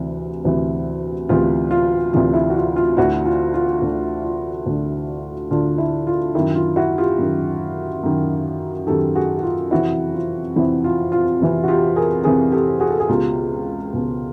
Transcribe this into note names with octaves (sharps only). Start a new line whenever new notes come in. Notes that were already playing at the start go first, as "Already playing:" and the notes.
Already playing: D2 C3 E3
D2 C3 E3
D2 C3 E3 F4 G4
F4
D2 C3 E3 F4
E4
F#4
F4
F4
D2 D3 E4 F#4
F4
F4
D2 D3
F4
D2 D3
D2 D3 F4
E4
F4
F#2 D#3 E4
F4
E4 F#4
F4 G4
F#2 D#3
F#2 D#3
F#2 D#3 G4 A4
F#4 G#4
F#4
F4
F2 C3 E3 E4 F#4
F4
F2 C3 E3 E4
F4
F4
F2 C3 E3
F#4
F4 G4
G#4 A#4
F2 C3 E3 G#4 A#4
G4 A4
F#4 G#4
A4
G#4
C#2 B2 F4 G4
C#2 B2